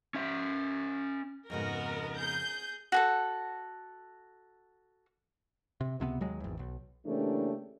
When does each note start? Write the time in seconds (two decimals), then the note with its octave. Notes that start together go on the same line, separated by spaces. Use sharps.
0.15 C#4 E5
1.50 F2 G#2 C#3 B3 F#4 A#4 D#5
2.17 G#4 G6
2.92 F#4 G#4 A4
5.81 C3
6.00 C#2 C3 G#3 B3
6.21 D#2 F#3 G#3
6.40 G#1 E2
6.59 B1
7.06 C#3 E3 A3 A#3 D4 G4